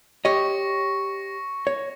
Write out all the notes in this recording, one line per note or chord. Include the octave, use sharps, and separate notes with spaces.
G4 C#5 D#5 C#6 A#6 C#7
C#5